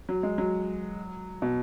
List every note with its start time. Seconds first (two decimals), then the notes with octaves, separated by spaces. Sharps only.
0.09 F#3
0.23 G#3
0.38 F#3
1.42 B2